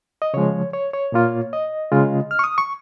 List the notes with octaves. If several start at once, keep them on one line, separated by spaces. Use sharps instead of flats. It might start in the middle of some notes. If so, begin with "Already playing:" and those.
D#5
C#3 F3 G#3 C#5
C#5
C#5
A#2 A#3 F4
D#5
C#3 G#3 F4
F6
C#6
D#6
C#6